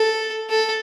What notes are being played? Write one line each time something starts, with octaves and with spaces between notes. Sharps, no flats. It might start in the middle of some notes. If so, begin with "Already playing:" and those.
Already playing: A4
A4